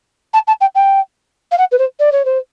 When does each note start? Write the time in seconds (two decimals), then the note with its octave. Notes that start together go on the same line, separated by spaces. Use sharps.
0.34 A5
0.47 A5
0.61 G5
0.75 G5
1.51 F5
1.58 F#5
1.72 B4
1.79 C5
1.99 D5
2.12 C#5
2.25 C5